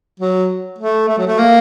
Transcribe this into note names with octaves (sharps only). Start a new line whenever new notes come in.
F#3
A3
A3
F#3
A3
A#3